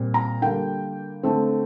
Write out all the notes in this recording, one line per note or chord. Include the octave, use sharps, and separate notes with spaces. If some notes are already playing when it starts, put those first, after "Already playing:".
Already playing: A#2 G3 C4
A#5
D3 G3 A#3 G5
D3 A3 C4